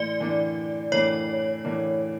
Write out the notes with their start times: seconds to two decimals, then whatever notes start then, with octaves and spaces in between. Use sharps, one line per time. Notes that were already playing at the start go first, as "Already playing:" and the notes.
Already playing: A2 E3 A#3 D5
0.20 A2 E3 A#3 D4
0.92 A2 E3 A#3 D4 C#5
1.64 A2 E3 A#3 D4